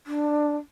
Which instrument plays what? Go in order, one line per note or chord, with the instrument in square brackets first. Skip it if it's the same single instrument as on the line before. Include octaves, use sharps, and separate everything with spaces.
[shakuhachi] D4